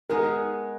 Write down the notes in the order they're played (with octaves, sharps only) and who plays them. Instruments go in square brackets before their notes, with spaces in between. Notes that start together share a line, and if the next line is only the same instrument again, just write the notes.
[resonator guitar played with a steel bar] G#3 B3 D#4 G#4 [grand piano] A#4